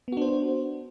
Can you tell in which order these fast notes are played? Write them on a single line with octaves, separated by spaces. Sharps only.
B3 F#4 D4 C5